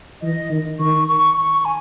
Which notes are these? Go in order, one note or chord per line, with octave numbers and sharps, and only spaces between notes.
E3 D#5
D#3
D#3 C#6
C#6
C#6
G#5